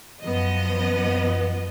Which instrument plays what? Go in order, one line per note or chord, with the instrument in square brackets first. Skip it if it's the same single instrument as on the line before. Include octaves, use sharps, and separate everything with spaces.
[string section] F#2 F3 B3 D#5